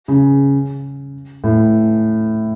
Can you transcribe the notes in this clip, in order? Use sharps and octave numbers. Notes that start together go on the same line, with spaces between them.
C#3
A2